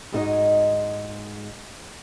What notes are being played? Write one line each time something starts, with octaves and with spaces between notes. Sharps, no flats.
G#2 G#3 A#3 D#4 F#4 D#5